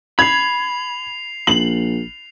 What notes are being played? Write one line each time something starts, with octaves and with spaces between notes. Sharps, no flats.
B5 G#6 C7 F7
A#1 F#7